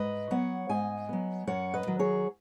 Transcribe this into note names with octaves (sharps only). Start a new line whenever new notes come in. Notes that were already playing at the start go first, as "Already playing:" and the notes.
Already playing: G#2 B4 D#5
F#3 B3 C#5 F#5
G#2 D#5 G#5
F#3 B3
F#2 C#5 F#5
B4 D#5
D#3 F#3
G#4 C#5